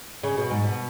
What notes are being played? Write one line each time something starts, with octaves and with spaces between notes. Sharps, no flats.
C#3
B2
G#2
B2